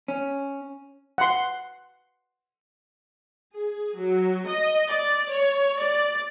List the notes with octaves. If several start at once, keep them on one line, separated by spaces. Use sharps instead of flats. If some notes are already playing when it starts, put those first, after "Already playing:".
C#4
F#5 C6
G#4
F#3
D#5
D5
C#5
D5